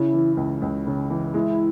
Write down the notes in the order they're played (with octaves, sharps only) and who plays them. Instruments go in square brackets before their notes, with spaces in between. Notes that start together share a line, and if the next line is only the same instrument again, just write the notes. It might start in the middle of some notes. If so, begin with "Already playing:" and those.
Already playing: [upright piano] C#3 [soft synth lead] E4
[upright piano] E3
C#2
C#2
C#3
E3
[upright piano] G#3 [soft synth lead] E4